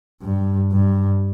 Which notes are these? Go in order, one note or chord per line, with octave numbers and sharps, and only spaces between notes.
G2
G2